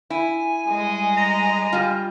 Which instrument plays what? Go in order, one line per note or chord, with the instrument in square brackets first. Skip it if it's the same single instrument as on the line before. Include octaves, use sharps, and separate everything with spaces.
[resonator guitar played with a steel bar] E4 [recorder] G#5
[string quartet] G3 G#3 D#5
[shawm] A#5
[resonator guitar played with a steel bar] G3 F4